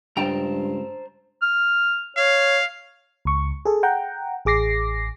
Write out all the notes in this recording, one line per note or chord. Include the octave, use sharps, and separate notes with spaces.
C#2 G2 C5 G5 A5 A#5
F6
C#5 F5
C#2 C#6
G#4 A4
F#5 G5 A#5
A1 G#4 D6 A#6 C7